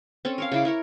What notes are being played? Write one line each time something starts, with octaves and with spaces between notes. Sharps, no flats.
C4 C#4 A4
A#4 C#5 F5
C#3 E4 D6
E4 A#4 C#5